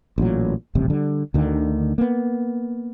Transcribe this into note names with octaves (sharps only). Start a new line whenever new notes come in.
A1 A#2 F#3
D#1 A1 C3
D3 G3
D2 D3 D#3
A#3 B3